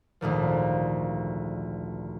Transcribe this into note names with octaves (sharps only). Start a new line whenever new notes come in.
G#1 D2 A#2 F3